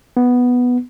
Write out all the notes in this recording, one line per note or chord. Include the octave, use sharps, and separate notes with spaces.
B3